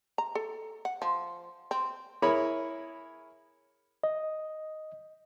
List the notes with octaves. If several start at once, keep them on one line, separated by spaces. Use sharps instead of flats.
A#5
A4
F#5
F3
C4
E4 G#4 A#4 C#5 B5
D#5